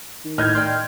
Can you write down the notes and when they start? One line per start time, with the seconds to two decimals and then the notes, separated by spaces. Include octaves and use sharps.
0.25 D#3
0.38 A2 D#5 F6 G6 G#6
0.55 D5 D#5 G5 C6